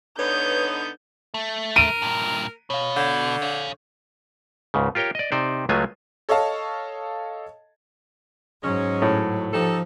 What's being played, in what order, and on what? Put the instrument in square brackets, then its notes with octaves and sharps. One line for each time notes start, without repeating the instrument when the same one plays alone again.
[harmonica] D3 B3 D#4 [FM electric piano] B4 [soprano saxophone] C#5 [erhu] G6
[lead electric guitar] A3
[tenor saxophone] A#4 [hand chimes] A#5 [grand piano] D7 D#7
[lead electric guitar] G2 A#2
[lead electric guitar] B2 [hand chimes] C#5 F5
[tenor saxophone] D3 [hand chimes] G6 G#6
[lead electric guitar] C#5 F5
[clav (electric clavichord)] C#2 G#2 C#3
F4 G4 A#4 C#5 G5
D5 D#5
C3 D#4 C5 D5
C#2 F#3 G#3 A3 F4 G#5
[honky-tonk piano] A4 C#5 D#5 F5 A5
[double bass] G#2 F#3 [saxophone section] G#3 C#4
[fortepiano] A2
[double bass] F3 [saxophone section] D#4 G4 A4